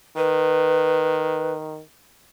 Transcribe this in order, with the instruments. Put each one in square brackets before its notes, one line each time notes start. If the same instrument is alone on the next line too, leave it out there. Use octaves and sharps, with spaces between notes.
[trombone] D#3 [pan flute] B4